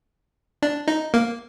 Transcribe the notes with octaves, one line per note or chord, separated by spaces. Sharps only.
D4
D#4
A#3